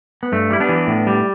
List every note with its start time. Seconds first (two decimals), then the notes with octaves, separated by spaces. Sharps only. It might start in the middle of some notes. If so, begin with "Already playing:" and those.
0.23 B3
0.32 G2 A3
0.50 G3 E4
0.60 B3 D4
0.69 E3
0.87 A2
1.07 G3